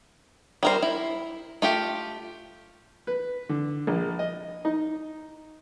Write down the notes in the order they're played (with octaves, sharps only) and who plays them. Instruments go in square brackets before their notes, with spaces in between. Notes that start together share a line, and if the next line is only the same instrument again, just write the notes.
[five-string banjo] G3 A#4 C5
E4
A3 F4 G4
[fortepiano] B4
D3
A#1
D#5
D#4